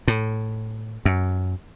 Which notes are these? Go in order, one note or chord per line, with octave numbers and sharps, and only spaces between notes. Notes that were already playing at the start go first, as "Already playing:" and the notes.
A2
F#2